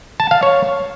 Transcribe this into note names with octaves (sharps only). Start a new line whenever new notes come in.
A5
F5
C#5